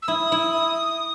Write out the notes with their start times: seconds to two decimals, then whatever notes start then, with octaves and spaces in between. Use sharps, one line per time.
0.02 E6
0.08 E4 D#6
0.32 E4